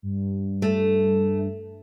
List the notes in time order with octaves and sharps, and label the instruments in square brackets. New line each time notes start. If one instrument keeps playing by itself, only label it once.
[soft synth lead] G2
[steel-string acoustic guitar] A3